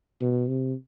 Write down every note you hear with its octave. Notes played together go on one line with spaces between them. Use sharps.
B2
C3